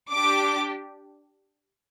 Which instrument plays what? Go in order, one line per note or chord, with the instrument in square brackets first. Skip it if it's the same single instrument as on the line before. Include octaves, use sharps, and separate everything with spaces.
[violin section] D4 G4 D6